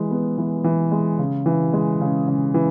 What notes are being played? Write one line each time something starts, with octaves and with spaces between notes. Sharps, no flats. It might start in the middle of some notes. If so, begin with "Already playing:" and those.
Already playing: E3 G#3
B3
E3
E3
G#3
C#3
E3
G#3
C#3
C#3
E3